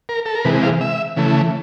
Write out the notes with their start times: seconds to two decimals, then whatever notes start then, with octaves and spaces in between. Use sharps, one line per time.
0.09 A#4
0.26 A4
0.35 A#4
0.45 C3 E3 G#3 B4
0.63 F5
0.81 E5
1.16 C#3 E3 A3